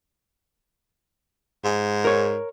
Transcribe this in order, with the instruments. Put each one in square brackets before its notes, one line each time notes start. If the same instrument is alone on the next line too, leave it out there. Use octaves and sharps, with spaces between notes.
[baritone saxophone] G#2
[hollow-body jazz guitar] A#4 C#5